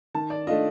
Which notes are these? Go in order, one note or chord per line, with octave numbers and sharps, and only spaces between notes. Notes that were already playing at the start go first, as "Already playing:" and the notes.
D#3 A5
D5
A3 D4 F4 D#5